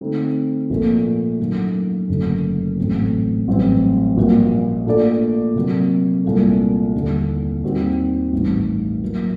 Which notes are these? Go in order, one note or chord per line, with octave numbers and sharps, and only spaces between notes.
D3 A3 C4 D#4
A#1 A#2 A3
F#2 D#3 A3
F#1 F#2 D3 A3
A1 A2 F#3 C4
A1 G2 F#3 C4
A#1 A#2 G3 A#3 F#4
A#2 A3 D4 A4 D5
C3 F#3 A#3
C2 A#2 A3
D#2 D3 G3
D#2 D#3 G3 C4 F#4
A1 G2 D#3
A#2 F#3 A#3